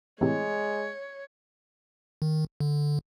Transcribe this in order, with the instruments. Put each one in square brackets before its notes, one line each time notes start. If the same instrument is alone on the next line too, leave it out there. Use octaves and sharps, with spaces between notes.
[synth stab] A2 C3 E3 [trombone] G#3 [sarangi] C#5
[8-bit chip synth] D#3
D3